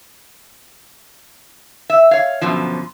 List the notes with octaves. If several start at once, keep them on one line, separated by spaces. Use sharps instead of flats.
E5
C#5 F5
F#2 B2 D3 F3